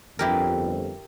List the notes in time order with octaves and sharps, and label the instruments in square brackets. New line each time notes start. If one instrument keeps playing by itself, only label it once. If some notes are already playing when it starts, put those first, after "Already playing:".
[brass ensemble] G1 F2 [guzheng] E4 G4 A#4